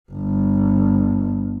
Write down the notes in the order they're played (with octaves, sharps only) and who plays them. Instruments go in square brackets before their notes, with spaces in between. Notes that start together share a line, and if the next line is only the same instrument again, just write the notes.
[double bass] G1